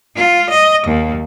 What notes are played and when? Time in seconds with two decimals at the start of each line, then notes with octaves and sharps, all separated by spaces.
0.16 F4
0.50 D#5
0.87 D#2